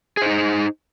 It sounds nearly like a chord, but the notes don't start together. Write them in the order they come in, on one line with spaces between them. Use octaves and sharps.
G#4 C5 D#4